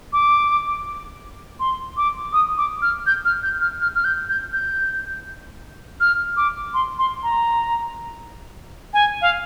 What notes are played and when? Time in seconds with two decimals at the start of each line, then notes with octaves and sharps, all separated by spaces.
0.13 D6
1.60 C6
1.97 D6
2.33 D#6
2.57 D6
2.82 F6
3.07 G6
3.25 F6
3.43 G6
3.61 F6
3.81 F6
3.95 F6
4.04 G6
4.29 G6
4.53 G6
6.00 F6
6.37 D6
6.74 C6
6.98 C6
7.23 A#5
8.94 G#5
9.22 F5